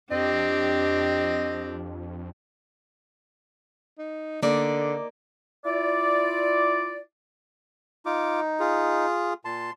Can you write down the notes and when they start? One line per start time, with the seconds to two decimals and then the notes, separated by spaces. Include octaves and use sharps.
0.11 F2 C4 D4 G4 D#5
3.98 D#4
4.43 D3 A#3 D#4 D5
5.65 E4 F4 D5
8.06 D#4 F4 D6
8.60 F4 G#4
9.45 A#2 A5 C6